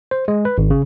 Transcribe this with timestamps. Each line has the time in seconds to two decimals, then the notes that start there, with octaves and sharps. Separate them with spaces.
0.11 C5
0.28 G#3
0.45 B4
0.58 G#1
0.70 C#3